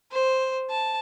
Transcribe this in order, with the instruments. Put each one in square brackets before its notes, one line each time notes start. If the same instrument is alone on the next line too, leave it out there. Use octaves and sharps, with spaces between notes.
[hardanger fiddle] C5
A5